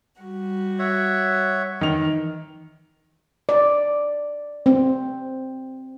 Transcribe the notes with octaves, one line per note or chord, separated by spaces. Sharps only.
G3 F#4
C#5 E5 F#5
D#3 E3 F7
D5
C4